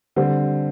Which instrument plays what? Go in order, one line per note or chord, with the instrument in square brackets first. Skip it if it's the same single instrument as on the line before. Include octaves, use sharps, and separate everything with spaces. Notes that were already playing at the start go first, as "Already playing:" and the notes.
[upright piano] D3 G3 C4